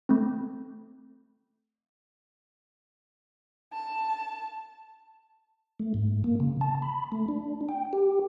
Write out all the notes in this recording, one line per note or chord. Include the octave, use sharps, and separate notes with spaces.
A3 C4
A5
A3
G#2
A#3
C#3
A5
B5
A3
D4
G5
G4